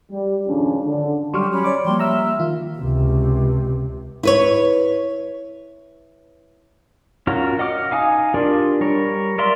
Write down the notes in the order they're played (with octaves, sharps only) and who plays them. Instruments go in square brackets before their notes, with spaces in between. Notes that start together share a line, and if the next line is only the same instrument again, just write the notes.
[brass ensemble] G3
G#1 F2 C#3 C#4 D4
D3
[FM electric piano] F#3 G3 [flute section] G4 [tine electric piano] C6 C#6 F6
[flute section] C#4 B5
[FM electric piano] C#5 D5 D6
[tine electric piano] F3 G3 A#3 [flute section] G5 C6
[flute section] E5 [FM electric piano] A#5 E6 F6
[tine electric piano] D#3 [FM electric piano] F4
[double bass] C#2 C3
[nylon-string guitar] E4 B4 C#5
[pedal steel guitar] C#4 F4 F#4 A#4
D#5 F#5 D6 F6
D#4 F5 G#5 D#6
D4 F4 G4 A#4 D5
G3 A#4 C#5
A#4 D5 E5 F5 C6